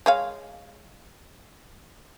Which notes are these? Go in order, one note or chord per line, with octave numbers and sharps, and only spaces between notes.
G#3 C#5 F5